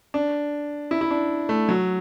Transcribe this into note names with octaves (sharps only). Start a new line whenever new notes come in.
D4
E4
E4
D4
A3
F#3